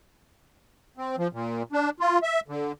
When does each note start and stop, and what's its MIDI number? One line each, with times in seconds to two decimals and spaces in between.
0.97 1.16 60
1.18 1.28 53
1.33 1.63 46
1.72 1.90 62
2.00 2.19 65
2.23 2.40 76
2.48 2.72 50